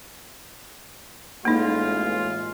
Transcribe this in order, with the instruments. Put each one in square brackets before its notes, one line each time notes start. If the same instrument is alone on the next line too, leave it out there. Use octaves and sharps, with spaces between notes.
[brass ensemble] A1 G#3 F4 [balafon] A#3 D#4